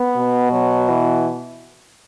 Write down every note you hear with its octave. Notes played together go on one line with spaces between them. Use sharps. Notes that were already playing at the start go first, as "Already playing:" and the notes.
Already playing: B3
B2
F#3
E3